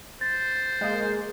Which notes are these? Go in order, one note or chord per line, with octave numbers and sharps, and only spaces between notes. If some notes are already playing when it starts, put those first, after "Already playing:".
C5 A6
G#3 A#3